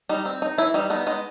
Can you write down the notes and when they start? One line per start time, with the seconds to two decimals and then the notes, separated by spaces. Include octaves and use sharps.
0.09 G3 D#4
0.25 C4
0.42 D#4
0.58 E3 E4
0.74 G3 D#4
0.90 B3 D#4
1.07 G#3 D#4